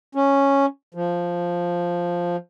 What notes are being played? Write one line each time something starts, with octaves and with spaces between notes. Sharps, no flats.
C#4
F3